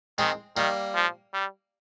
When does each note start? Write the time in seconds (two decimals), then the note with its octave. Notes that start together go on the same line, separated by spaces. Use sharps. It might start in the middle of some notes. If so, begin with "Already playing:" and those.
0.18 D#3 G#3 C4
0.57 D#3 G3 A#3
0.95 F3
1.34 G3